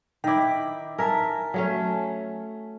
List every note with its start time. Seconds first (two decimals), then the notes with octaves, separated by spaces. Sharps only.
0.24 D#3 E4 G5 D6
0.98 A#4 E5 G#5 A5
1.54 F#3 A3 C#4